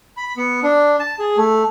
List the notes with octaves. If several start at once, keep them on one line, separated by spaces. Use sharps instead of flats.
B5
B3
D4
A5
G#4
A3